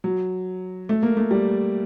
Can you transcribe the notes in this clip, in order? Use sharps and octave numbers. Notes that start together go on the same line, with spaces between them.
F#3
A3
A#3
A3
G3